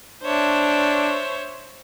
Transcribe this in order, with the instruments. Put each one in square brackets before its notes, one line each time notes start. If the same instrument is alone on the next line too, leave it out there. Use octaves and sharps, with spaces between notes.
[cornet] D4 [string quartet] C5 C#5 E5